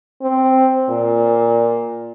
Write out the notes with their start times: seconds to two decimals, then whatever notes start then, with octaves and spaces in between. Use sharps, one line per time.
0.22 C4
0.89 A#2